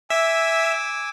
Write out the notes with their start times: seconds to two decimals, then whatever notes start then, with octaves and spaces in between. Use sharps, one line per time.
0.10 E5 G#5 D6 E6